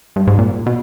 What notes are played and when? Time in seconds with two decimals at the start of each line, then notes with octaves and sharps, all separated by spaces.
0.16 G2
0.27 G#2
0.39 A#2
0.66 B2